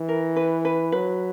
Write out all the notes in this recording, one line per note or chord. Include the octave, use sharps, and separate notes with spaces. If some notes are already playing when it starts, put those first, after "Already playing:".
Already playing: E3
A#4
B4
B4
F#3 B4